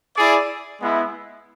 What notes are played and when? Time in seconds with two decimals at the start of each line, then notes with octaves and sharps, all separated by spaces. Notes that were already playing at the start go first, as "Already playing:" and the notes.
0.15 E4 G#4 D5
0.80 G#3 B3 E4